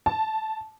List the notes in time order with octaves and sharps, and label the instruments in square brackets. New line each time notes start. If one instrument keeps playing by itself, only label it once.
[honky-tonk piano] A5